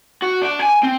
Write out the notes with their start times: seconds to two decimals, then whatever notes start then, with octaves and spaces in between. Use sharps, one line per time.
0.22 F#4
0.42 D4
0.62 G#5
0.83 C4